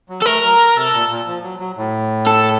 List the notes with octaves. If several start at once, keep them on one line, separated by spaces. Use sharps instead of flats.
F#3
A4
A3 A#4
F#3
C3 A4
A#2
A#2
F3
F#3
F#3
A2
A4